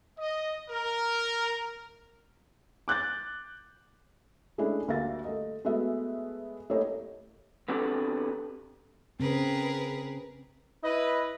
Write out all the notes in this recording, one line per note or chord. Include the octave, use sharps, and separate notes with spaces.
D#5
A#4
D6 F#6 G6 A6
G#3 A3 C#4 D4 E4 G#4
D2 A#3 G4 E5 F5 A6
A3 D#5
G#3 A3 B3 F#4 E5
A3 A#3 E4 G4 C#5 D#5
B3 C4 D4 F#4 G4 A4
C#3 C4 G#4 A#4 B4
E4 B4 D#5